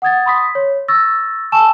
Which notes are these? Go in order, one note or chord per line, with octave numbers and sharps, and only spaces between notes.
F#5 D#6 G#6 A6
B5 C6 D#6 B6
C#5
C#6 E6 A6 A#6
G#5 A5 C#6 E6 E7